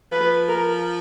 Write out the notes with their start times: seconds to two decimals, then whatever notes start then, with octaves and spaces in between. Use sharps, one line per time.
0.12 F3 B4
0.49 A#4